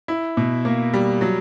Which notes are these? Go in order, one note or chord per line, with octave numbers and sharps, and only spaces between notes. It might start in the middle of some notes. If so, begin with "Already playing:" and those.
E4
B2
A#3
G3
F#3